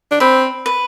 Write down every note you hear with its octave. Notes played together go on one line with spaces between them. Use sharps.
D4
C4 B5
B4